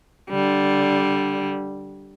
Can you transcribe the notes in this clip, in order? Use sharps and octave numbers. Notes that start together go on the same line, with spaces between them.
D3 G3